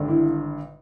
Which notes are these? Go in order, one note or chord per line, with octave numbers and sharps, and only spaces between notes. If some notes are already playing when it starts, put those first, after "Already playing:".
Already playing: G#1 G2 D3
E4